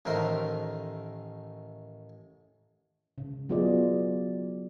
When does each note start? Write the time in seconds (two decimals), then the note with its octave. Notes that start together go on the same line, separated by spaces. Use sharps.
0.05 A1 D#3 A3 A#4 C5
3.18 C#3
3.49 F#3 B3 F4 G#4 D5 D#5